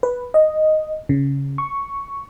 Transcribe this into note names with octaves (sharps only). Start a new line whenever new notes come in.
B4
D#5
C#3
C#6